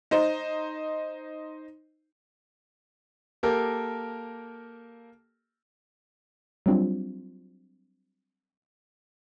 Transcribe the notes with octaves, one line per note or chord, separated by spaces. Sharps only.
D#4 C5 D#5
A#3 G4 A4 A#4
F#3 G3 C4 D4 F4